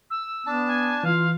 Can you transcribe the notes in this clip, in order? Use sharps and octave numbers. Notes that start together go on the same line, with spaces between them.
E6
B3 D4 A5
G#5
E3 F4 F5